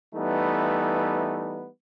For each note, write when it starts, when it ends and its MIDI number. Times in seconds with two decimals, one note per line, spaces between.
0.15 1.68 52
0.15 1.68 55
0.15 1.68 57
0.15 1.68 59
0.15 1.68 63